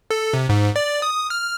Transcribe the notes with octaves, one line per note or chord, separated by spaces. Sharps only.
A4
C3
G#2
D5
D#6
F6